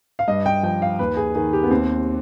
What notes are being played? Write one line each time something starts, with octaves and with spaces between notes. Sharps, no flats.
F5
G2 D#5
G5
F3 G5
F5
D#2 B4
G#4
D#3 G#4
G4
B3
D#2 C4